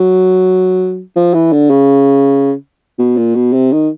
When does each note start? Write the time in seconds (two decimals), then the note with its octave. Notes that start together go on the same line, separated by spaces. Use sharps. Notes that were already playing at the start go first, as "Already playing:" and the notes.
Already playing: F#3
1.16 F3
1.34 E3
1.52 D3
1.70 C#3
2.99 B2
3.17 A#2
3.35 B2
3.53 C3
3.72 D#3